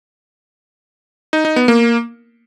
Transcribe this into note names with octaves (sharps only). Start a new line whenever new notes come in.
D#4
D#4
B3
A#3